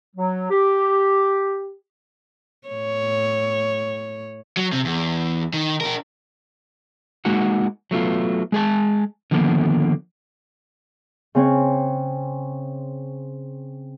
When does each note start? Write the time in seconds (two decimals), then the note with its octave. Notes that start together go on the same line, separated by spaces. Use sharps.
0.16 F#3
0.51 G4
2.68 A2 C#5
4.57 F#3
4.72 C3
4.85 E2
5.53 D#3
5.81 D4 A#4
7.25 G#3 A#3 D#4 F#4 F#5
7.91 F#3 A3 B3 F4
8.52 G#3 G#4 A5
9.31 D3 D#3 F3 A#3 B3
11.35 C#3 C4 C#5